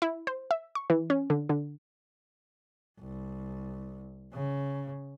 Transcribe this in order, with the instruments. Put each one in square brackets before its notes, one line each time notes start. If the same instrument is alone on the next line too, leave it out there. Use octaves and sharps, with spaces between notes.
[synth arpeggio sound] E4
C5
E5
C#6
E3
C#4
D3
D3
[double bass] C2
C#3